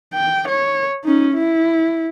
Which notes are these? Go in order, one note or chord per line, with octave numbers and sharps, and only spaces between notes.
G5
C#5
C#4 D#4
E4